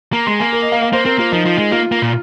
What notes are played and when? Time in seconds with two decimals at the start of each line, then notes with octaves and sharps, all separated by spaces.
0.13 A#3 A#5
0.26 G#3 C6
0.40 A#3 G#5
0.53 A#4
0.62 D#5
0.72 F5
0.82 F5
0.93 A#3 C5
1.05 C4 A#4
1.18 A#3 F4
1.32 F3 D#4
1.46 F3
1.58 G#3
1.72 A#3 F4
1.92 A#3
2.02 A#2